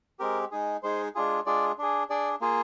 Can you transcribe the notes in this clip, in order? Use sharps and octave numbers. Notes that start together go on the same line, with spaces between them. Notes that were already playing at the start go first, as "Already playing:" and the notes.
G#3 C4 G4 A#4
G#3 D#4 G#4
G#3 D#4 G#4 C5
G#3 D4 F4 G#4
G#3 D4 F4 G#4 D5
D4 G#4
D4 G#4 D5
A#3 F4 G#4